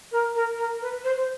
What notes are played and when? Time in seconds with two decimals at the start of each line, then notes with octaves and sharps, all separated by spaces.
0.11 A#4
0.34 A#4
0.57 A#4
0.81 B4
1.03 C5